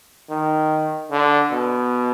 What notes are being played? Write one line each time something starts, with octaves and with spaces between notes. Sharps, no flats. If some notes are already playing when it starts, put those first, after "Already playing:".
D#3
D3
B2